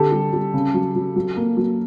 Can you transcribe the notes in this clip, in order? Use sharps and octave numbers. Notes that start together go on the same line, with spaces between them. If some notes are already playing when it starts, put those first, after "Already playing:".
Already playing: D3 G4 A4
G3
G3
C#3
F#3
F#3
F#3
A#3
F#3